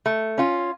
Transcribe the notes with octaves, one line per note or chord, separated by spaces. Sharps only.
A3
C#4 F4